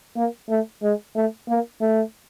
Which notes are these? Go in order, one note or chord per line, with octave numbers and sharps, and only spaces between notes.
A#3
A3
G#3
A3
A#3
A3